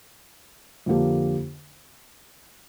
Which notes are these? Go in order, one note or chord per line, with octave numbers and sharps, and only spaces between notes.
F2 D3 A#3 D4 G4